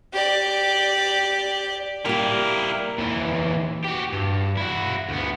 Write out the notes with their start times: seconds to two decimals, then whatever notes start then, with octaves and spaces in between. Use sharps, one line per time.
0.14 G4 D5
2.06 G3 A#3 E4 G4 A#4
2.99 D#2 E3
3.84 F#4 G4
4.12 G2
4.57 E4 F#4
5.09 D2 B3